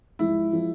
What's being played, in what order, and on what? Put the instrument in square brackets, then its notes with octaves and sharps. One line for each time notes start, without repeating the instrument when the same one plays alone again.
[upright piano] G#2 F3 G#3 [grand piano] E4
[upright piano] F3 G#3